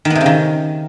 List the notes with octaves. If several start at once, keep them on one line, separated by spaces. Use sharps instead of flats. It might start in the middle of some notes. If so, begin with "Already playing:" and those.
D#3
B3
C3
C#3
D#3